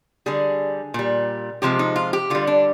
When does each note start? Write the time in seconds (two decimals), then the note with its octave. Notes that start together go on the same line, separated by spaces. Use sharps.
0.26 D3 G3 G#4
0.94 A#2 G3
1.62 C3 F3 G#3 G4
1.79 D#4
1.96 F4
2.13 G4
2.30 D3 G3 F4
2.47 D4